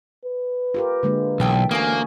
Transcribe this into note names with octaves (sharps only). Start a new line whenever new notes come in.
B4
F4 G4 A#4
D3 G#3 A#3
B1 E3 E5 G5 A5
D2 A#3 C#4 D#6